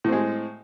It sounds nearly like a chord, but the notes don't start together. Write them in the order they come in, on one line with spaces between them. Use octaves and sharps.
A2 C4 G#3